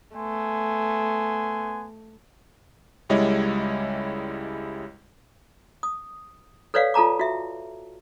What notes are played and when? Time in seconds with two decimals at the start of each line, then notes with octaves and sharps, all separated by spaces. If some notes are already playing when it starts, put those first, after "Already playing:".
0.16 A3 B3 G#5 C6
3.09 C#2 G3 G#3 E4 C#5 D#5
5.83 D#6
6.74 A4 B4 C#5 D5 F5 F#5
6.94 F4 A4 A5 A#5 D6
7.19 F#4 E5